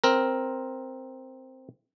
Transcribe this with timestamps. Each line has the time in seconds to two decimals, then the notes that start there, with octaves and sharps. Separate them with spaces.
0.04 C4 A#4